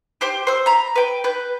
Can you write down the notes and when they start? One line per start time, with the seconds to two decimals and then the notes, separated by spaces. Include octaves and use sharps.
0.21 G4 C5 G5
0.47 C5 E6
0.66 A#5 B5
0.96 B4 G5
1.24 B4 G6